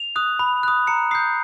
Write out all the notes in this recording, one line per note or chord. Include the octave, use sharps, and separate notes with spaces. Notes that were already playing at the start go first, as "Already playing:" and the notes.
Already playing: F7
D#6 F#6
B5
D#6 F#6
A#5 C#7
D#6 G6 C7